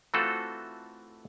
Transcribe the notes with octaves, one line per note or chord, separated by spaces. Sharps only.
E3 A3 C4 F4 F#4 A4